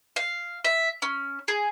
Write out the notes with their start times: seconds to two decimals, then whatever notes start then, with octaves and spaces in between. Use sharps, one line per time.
0.16 F5
0.65 E5
1.02 C#4
1.48 G#4